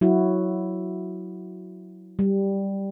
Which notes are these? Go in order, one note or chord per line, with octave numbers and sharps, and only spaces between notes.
F#3 E4 F#4
G3